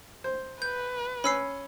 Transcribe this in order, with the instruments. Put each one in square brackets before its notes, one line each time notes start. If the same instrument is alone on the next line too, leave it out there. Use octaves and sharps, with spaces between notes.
[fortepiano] C5
[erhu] B4 [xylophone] G6
[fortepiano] C#4 [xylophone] B5 E6 C7